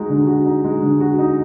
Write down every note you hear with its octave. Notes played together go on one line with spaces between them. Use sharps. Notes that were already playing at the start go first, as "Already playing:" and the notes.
Already playing: G#3 D#4 F#4
D3
F#4
D#4
G#3
D3
F#4
D#4